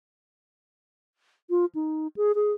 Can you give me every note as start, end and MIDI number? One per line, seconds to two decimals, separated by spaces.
1.50 1.65 65
1.75 2.07 63
2.17 2.32 68
2.35 2.52 68